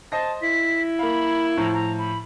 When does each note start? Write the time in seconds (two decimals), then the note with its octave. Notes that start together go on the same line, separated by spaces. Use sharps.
0.12 C5 D#5 A5 A#6
0.42 E4 B6
0.99 A#3 F5 B5
1.57 A2 F3 A#5
1.73 A#5
1.99 B5